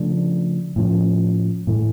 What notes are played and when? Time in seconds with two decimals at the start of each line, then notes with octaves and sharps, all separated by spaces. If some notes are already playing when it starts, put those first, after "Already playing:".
Already playing: C#3 F3 A3 D4
0.76 A2 F3 C#4
1.67 A2 E3 A3